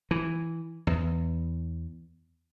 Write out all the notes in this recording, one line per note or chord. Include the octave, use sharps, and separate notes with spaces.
E3
E2